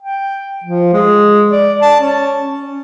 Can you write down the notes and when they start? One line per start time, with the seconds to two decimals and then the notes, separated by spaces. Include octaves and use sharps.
0.02 G5
0.64 F3
0.93 G#3
1.51 D5
1.82 A5
2.00 C#4
2.46 C#4